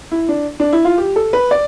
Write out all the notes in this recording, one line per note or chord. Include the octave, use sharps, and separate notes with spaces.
E4
D4
D4
E4
F4
G4
A4
B4
D5